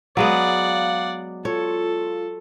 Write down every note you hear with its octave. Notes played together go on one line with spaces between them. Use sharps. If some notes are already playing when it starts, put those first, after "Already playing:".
F#3 G#3 B3 D5 F5 F#5
F4 A4 C#5